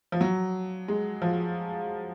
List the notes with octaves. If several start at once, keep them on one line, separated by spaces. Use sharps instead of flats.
F3
F#3
G#3
F3